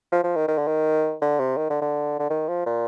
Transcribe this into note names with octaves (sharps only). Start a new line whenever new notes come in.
F3
F3
D#3
D#3
D3
D#3
D3
C3
D#3
D3
D3
D3
D#3
F3
A#2